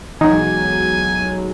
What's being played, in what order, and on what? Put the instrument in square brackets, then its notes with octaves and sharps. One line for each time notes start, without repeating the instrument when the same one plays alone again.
[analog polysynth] B1 F#3 G#3 [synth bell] E3 F#5 [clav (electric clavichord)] D#4 [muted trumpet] G#5